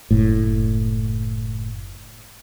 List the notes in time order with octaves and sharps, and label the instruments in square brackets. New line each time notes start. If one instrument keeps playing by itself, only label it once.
[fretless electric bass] F#1 A2